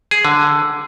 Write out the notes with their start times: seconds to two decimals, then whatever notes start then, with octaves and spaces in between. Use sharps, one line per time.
0.11 G#4
0.25 D3